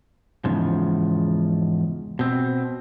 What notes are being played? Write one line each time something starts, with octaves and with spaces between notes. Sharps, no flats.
E2 G#2 C#3 F3
B2 C4